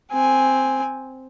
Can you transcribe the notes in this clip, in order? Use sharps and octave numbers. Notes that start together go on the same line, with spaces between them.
C4 G#5